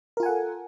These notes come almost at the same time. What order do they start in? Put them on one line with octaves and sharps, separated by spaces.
A#4 F4 G#5 F#5 A4